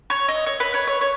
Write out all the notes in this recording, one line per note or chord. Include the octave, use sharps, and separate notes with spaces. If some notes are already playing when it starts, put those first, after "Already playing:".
C#5
D#5
C#5
B4
C#5
C#5
C#5